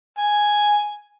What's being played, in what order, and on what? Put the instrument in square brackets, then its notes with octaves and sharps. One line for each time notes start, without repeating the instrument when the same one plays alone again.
[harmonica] G#5